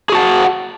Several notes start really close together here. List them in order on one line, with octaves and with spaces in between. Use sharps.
G#4 F#4 A5 F#5